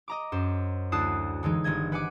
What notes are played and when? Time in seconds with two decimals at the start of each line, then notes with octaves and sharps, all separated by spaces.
0.08 D#5 A#5 D6
0.32 F#2 C5
0.92 D2 E4 A5 D#6 F#6 C7
1.43 D3 E3 G#3 D#4
1.64 G1 D#3 D#5 G#6
1.92 B4 F#5 G#5 D6